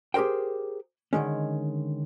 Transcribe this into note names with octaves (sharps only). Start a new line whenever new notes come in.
G4 G#4 A#4 C5 G5
D3 D#3 G#3 C#4